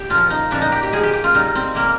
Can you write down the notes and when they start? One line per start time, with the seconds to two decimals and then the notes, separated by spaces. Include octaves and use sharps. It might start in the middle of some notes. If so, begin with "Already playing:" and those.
Already playing: G4
0.10 A#2 F3 F4
0.30 D#4
0.51 A#2 F3 D4
0.62 D#4
0.72 G4
0.83 G4
0.92 A#2 F3 G#4
1.03 G4
1.13 G4
1.24 F4
1.34 A#2 G3 D#4
1.55 C4
1.75 A#2 G3 A#3